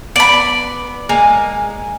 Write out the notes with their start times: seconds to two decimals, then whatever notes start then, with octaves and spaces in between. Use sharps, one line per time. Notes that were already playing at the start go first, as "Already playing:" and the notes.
0.16 B3 D5 B5
1.09 G#3 A#3 G#5